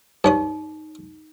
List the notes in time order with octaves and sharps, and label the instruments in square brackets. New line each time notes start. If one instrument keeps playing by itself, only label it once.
[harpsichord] G2 C#5 D#6 [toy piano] D#4